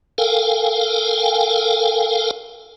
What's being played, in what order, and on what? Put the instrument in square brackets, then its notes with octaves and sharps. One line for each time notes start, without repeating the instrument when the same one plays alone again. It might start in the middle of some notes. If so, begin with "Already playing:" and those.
[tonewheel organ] A4 A#4 F5 G5 G#5